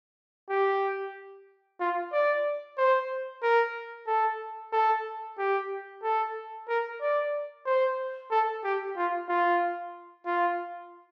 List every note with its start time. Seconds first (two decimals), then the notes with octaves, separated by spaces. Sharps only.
0.50 G4
1.80 F4
2.12 D5
2.78 C5
3.43 A#4
4.07 A4
4.73 A4
5.38 G4
6.03 A4
6.68 A#4
7.01 D5
7.66 C5
8.31 A4
8.64 G4
8.97 F4
9.29 F4
10.26 F4